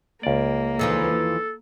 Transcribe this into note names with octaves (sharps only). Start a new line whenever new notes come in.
C#2 A#3 D5
D#2 E3 F3 A4